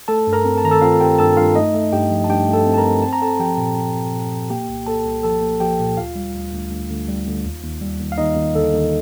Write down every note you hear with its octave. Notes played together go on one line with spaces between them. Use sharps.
A3 A4 A5
G2
A#4 A#5
C4
A5
D#3 A#5
A4 A5
C4 F4 F5
C4 G4 G5
G2 A4 A5
G2 F4 F5
A3 D#4 D#5
A3
G2 G4 G5
F3
A5
G2 G4 G5
A3
A4 A5
C4
A5
A#4 A#5
C4
C4 A5
A#5
C4 A4 A5
F3 G4 G5
A#2
C4
A#2
A#2
A#2
A#3 G4 G5
C2
A#3 A4 A5
C2
F3 A4 A5
A#3
F3 G4 G5
A#2
D2 F4 F5
G3
D2
D2
D2
D2
G3
D2
D#2
D#2
G3
D#2
F5
D#2 D#4 D#5
D#2
D3 A4
D#2